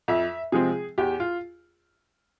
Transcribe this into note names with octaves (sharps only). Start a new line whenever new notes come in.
F2 E5
C3 F3 G#3 C4 G#4
E2 G4
F4